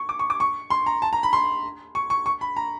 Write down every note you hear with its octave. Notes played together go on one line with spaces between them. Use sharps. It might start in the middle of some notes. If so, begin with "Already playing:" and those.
Already playing: C#6
D6
C#6
D6
C#6
C6
A#5
A5
A#5
B5
C6
C#6
C#6
C#6
B5
A#5